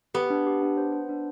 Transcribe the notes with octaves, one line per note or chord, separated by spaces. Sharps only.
B3 G4
D4
G4
D4
C5
C5
D4